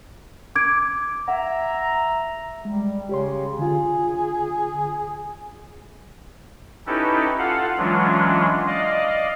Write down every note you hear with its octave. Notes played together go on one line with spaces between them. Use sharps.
D6 G#6 D7
E5 F#5 A#5
G3 G#3
C#3 G4 C#5 C6
D3 F4 G#4
C#4 D#4 E4 G4 A4 B4
F4 A4 F5 F#5
E3 F#3 G#3 C#4 D4 F4
D5 D#5 F5